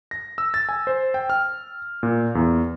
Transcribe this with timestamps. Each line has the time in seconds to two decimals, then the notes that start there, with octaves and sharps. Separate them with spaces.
0.11 A#6
0.38 E6
0.54 A6
0.69 G#5
0.87 C5
1.14 G5
1.30 F6
2.03 A#2
2.35 E2